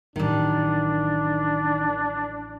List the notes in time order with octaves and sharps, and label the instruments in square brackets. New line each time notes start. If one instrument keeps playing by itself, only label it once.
[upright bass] A1 F#3 [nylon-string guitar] D#3 [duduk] D4